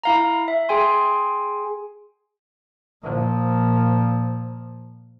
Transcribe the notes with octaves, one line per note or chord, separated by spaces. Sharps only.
E4 F5 A#5
E5
G#4 G5 G#5 C6
A#2 F3